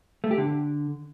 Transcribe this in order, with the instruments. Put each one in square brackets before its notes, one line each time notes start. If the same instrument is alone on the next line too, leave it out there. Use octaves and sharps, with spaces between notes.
[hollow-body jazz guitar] A3
G4
D3